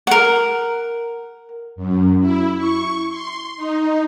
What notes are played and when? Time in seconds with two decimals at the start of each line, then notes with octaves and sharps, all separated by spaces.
0.07 A#4 F#5
1.76 F#2
2.20 E4
2.57 C#6
3.09 C6
3.56 D#4